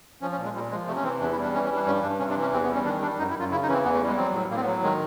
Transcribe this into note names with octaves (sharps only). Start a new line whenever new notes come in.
F3 C#4
C#4
A#2
G#3
A#2 G3
F3 G#3
C3 A3
C#4
E3 C4
E2 D4
E4
G3
D4
E3 C#4
C#4
G3 D4
G2 C#4
G2 D4
C3 C#4
D4
E3
C#4
E2 C4
B3
G3 C#4
D#3 D4
G3 D4
F#2 D#4
E4
F#2 F4
C#3 E4
D#4
E3 C#4
C4
E2 B3
A3
G3
G#3
F#3 C4
A2
A2 A#3
C4
B3
F#3
D#3 G#3